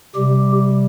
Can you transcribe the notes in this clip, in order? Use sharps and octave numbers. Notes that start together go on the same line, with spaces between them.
C3 G3 G4